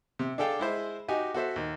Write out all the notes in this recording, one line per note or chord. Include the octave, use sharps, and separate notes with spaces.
C3
D4 G#4 A4 F5 G5
G#3 E4 C5
D#4 F#4 G4 G#5
F#4 A4 C5 E5
D#2